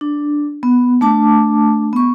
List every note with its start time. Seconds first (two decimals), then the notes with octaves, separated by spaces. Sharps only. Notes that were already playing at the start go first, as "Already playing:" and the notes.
0.01 D4
0.63 B3
1.01 A3 D4 A5 D6
1.93 B3 C#6